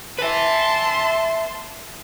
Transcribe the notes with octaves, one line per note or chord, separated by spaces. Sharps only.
B4 E5 A5 C6